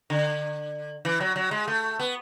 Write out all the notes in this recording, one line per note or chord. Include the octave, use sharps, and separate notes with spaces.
D3
E3
F#3
F#3
G#3
A3
B3